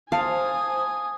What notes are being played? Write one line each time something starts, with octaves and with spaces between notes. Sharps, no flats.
C5 F5 G#5 A5 D#6